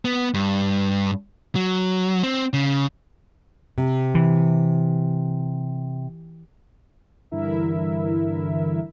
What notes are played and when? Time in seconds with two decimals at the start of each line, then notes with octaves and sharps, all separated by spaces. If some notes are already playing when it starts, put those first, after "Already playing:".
0.05 B3
0.34 G2
1.56 F#3
2.23 C4
2.53 C#3
3.78 C3
4.15 E3
7.31 G2 D3 E3 E4 A#4 E5